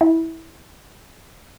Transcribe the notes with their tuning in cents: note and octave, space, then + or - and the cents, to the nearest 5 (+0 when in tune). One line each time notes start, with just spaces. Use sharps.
E4 -15